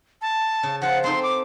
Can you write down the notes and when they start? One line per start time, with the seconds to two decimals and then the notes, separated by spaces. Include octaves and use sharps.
0.22 A5
0.63 C#3
0.82 F3 F4 F#5
1.04 C4 D#4 A4 C6
1.23 D6